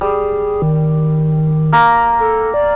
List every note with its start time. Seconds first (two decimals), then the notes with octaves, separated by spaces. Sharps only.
0.01 G3 G#4
0.62 D#3
1.73 A#3 A#4
2.19 A4
2.54 D5